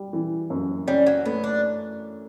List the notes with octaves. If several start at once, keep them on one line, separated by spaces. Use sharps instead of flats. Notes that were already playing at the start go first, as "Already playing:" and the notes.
Already playing: G3
E3
F#2
G3 C#4
F#3
A3 B3
D4